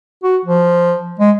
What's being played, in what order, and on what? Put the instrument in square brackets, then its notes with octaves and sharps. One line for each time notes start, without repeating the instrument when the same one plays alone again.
[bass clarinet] F#4
F3
G#3